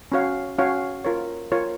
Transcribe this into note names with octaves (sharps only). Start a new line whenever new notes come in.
C#4 F#4 C#5 F5
C#4 F#4 C#5 F5
F4 A#4 C#5
F4 A#4 C#5